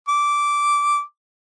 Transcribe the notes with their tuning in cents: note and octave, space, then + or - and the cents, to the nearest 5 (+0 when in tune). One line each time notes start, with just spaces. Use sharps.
D6 -10